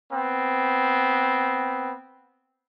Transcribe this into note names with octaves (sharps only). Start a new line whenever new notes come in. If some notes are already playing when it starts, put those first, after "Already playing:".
B3 C4